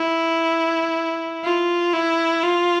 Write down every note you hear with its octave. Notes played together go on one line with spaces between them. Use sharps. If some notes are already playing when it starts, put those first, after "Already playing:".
Already playing: E4
F4
E4
F4